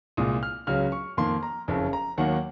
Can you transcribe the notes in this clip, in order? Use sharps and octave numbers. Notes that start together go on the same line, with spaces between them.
C2 A#2 G#3 D#6
F6
C#2 C#3 F#3 F6
C#6
F2 D#3 A#3 C6
A#5
F#1 F2 C#3
A#5
D#2 D#3 F#3 A#3 F#5